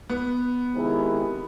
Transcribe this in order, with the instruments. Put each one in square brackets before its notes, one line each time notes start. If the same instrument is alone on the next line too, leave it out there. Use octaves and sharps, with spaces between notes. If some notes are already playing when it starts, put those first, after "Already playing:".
[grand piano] B3
[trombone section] C3 D#3 G#3 C4 E4